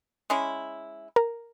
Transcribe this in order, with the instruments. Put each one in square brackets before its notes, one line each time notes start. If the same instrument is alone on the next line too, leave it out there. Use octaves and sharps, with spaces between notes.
[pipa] G#3 C#4 E4
[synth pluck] A#4